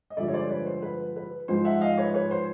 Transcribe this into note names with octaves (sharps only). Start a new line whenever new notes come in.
D#5
G2 D3 F3 G#3 D5 E5
C#5
C5 D5
B4 C#5
C5
B4
B4
G#2 F3 G#3 C5
E5 F#5
D#5 F5
B4 C#5
B4 C#5
C5